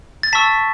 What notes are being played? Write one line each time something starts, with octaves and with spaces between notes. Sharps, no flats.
A6
A5 C#6 E6 B6